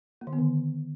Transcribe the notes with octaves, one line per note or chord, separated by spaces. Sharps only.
A#3
D#3
B3
D3